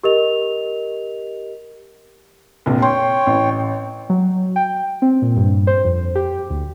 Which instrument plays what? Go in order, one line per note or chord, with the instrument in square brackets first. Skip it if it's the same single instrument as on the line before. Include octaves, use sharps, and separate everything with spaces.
[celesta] G4 A#4 D#5 F7
[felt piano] F1 A#1 F2
[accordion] C#5 G5 [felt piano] C6
[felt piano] A1
[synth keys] F#3
G5
C4
A#2
G2
C5
F2
G4
D2